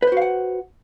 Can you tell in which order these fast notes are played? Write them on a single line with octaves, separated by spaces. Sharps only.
B4 C5 F#4 F5 F#5